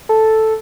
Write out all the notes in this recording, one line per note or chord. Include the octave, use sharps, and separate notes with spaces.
A4